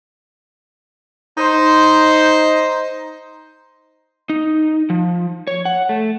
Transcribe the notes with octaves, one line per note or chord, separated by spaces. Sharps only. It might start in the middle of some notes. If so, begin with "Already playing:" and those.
D#4 C5
D#4
F3
C#5
F#5
A3